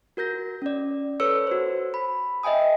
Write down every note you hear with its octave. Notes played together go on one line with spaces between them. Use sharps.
F#4 A#4 G6 A#6
C#4 D5
A4 B4 C#5 E6 C#7
F#4 C5
B5
D#5 E5 G5 G#5 D#6